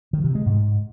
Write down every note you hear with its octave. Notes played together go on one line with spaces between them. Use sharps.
D#3
C3
G#3
G#2